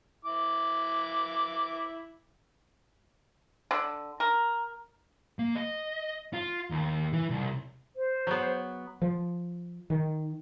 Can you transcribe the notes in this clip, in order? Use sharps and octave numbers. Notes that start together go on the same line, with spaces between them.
E4 D6
D3
A#4
A#3
D#5
F4
D#2
E3
C2
C5
F#3 B3
F3
D#3